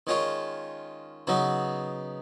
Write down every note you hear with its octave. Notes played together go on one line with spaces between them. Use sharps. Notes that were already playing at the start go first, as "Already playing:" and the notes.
D#3 G#3 C#4 F4
C#3 F#3 B3 D#4